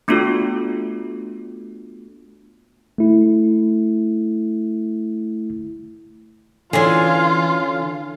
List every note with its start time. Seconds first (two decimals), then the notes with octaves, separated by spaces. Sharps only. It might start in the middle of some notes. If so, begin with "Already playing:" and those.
0.08 A3 B3 D4 F4 F#4 A4
2.98 A3 E4
6.73 D3 E3 C#4 F4 G#4 G#5 C6